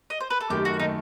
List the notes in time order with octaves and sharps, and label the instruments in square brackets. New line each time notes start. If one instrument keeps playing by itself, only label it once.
[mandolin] D#5
C5
B4
A4
[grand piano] F#2 D#3 A3 [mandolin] G4
[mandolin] F#4
[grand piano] D#3 A3 [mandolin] D#4